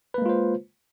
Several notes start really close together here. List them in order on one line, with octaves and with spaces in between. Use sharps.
B4 A#3 G#3 F4 C5